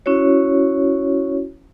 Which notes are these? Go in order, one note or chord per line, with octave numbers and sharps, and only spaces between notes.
C#4 E4 F#4 C#5